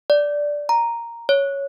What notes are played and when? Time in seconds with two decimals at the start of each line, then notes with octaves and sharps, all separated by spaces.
0.10 D5
0.69 A#5
1.29 C#5